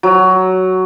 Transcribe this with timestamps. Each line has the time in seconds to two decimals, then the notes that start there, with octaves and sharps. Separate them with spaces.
0.03 F#3